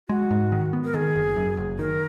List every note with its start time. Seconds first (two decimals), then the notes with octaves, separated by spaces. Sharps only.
0.09 G#3 F#4
0.31 G#2
0.52 D#3
0.73 B3
0.84 A#4
0.94 D#3 G#4
1.15 F#1
1.36 F#2
1.57 F#1
1.79 D#3 A#4